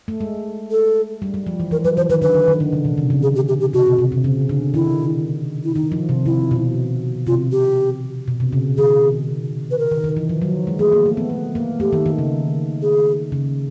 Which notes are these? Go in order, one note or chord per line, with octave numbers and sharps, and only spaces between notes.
A3
G#3
A4
G3
G3
F3
E3
E3 A#4
F#3 B4
E3 C5
D#3 B4
D3 B4
D3
D#3
D3
C#3
B2
C3
C#3
G#4
G4
G4
G4
C3 F#4
B2
C3
C3
C#3
D3
D#3 E4
E4
D#3 D#4
F3
C3
C3 E4
B2
C3 F4
G4
B2
C3
C#3
D#3 G#4
B4
A#4
D#3
D#3
E3
F3
F#3
G#3
A3 G#4
A#3
A3
B3
A3
A#3
A3 G4
D#3
D#3
C#3
G#4
C#3